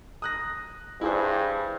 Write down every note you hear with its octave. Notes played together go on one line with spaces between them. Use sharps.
D#6 F#6 A#6
G2 E4 G#4 C5